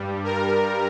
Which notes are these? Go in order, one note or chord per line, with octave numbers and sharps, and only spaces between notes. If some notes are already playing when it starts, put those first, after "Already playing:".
Already playing: G2 G3
A#4